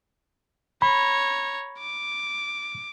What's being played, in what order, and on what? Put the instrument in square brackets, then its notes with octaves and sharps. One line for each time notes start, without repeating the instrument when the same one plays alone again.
[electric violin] C#5 A#5 [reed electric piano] B5
[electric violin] D6